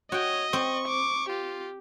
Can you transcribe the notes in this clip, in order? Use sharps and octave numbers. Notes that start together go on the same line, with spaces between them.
F#4 C#5 D#5 G5
C4 C#6
D6
F4 G4